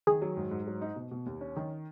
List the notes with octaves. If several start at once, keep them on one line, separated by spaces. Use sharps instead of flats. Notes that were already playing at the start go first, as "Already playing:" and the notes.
D#3 G#4
F#3
G#2
G#2
F#3
D#4
B2
B2
D#2
C#4
D#3